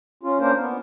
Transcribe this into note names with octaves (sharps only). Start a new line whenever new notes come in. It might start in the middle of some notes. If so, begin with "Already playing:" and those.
C#4 F4
A#3 C#4 D4 A#4 C5
B3